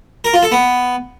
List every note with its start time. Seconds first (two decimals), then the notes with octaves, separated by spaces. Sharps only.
0.24 A#4
0.34 F4
0.43 A4
0.52 B3